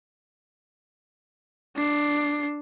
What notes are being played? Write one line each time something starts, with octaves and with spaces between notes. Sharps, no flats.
D4 C7